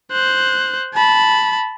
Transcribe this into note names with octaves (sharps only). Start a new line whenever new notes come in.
C5 F#6
A5 B5